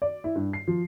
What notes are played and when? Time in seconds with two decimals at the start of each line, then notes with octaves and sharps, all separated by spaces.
0.02 D5
0.24 E4
0.36 G2
0.53 C7
0.68 F3